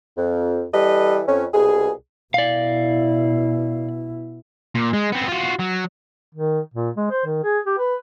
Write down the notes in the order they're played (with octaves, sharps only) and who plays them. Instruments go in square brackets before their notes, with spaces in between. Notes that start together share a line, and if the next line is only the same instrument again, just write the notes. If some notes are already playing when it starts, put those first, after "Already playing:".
[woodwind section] F2
E3 G3 A4 B4 D#5
F2 C#4
C2 B2 G#4
[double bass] B2 E4 [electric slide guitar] D5 F5
[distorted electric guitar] A#2
G#3
B3 C4
F4 F#4
F#3
[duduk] D#3
A#2
G#3
C5
D#3
G#4
G4
B4